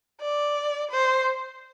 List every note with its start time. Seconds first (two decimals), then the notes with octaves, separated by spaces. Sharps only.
0.21 D5
0.90 C5